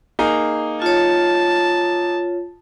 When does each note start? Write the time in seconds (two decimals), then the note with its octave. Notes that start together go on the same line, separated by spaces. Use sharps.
0.19 A#3 D#4 G#4
0.82 F4 C#5 A5